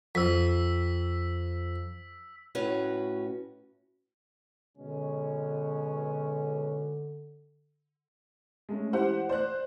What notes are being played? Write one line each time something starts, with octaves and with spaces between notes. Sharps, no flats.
F2 E6 B6
A2 C#4 F#4 B4
B2 D3 G#3 C#4
G#3 A3 C#4
E3 G4 C5 F#5
C5 D5 F#6